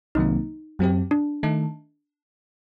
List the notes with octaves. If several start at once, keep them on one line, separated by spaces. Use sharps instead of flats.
C2 C3 D#3 F#3 A#3 D#4
F#2 F#3 C4 G4
D4
D#3 A3 D#4 A4